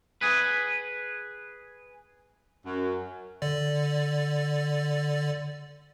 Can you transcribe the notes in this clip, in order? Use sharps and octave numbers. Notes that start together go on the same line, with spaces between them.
G#4 B4
F#2
D3 D5